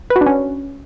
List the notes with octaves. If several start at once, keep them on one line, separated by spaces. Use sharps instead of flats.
B4
F#4
D4
C#4